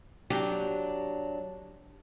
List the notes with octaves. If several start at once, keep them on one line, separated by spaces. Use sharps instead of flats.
F#3 D4 G4